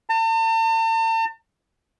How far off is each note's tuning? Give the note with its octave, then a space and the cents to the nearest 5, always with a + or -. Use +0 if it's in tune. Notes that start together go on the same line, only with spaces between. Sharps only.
A5 +40